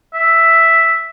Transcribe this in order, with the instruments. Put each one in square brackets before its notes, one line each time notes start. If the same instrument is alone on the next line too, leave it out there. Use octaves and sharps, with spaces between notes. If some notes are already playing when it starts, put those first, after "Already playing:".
[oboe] E5